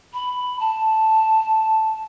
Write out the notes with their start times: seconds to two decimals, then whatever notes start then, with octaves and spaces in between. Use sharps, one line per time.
0.14 B5
0.60 A5